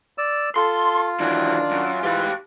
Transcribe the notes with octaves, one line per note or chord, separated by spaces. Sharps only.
D5 E6
F4 A4 C6
D#3 E3 F#3 D4
F#2
G#2 E3 G4 F5